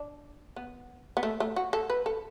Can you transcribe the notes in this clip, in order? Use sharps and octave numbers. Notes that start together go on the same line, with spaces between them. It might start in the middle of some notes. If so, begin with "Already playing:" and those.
Already playing: D4
B3
B3
A3
A3
F#4
A4
B4
A4